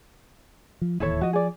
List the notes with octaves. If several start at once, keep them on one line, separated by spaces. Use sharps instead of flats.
F3
D1 D#2 E3 E4 A4 C#5
F3 F#4 D#5
G#4 D5